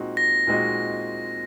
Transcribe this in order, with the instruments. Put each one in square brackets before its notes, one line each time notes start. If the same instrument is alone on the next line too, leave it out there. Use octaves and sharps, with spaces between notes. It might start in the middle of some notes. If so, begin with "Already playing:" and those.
Already playing: [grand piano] A#2 G#3 C4 D#4 F#4
[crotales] A#6
[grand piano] A#2 G#3 C4 D#4 F#4